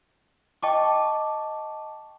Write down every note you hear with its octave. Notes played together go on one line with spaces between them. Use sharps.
D#5 G5 A5 C#6 D6